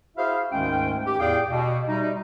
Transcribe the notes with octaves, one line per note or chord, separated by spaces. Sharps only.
E4 F#4 G#4 C5 E5 F5
D2 G#2 D#3 G#3 C#4 G5
G4
E2 A2 G#4 D5 F5 G5
B2
C3 G3 D#4